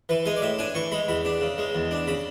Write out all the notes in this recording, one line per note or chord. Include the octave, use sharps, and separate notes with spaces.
E3 B4
G#3 G#5
D5
A2 E5
D4 G#5
E3 C#6
G#3 B5
E2 B5
D4
C#3
G#3
E2
D4
C#3 B5